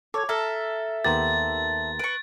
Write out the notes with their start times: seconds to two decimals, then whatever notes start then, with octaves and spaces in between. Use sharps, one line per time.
0.14 A4 C#5 D6 G#6
0.29 A4 E5 A5 A#5 F6 A#6
1.05 D#2 B3 G4 A#4 A#5 C6 A6
1.99 B4 C#6 D7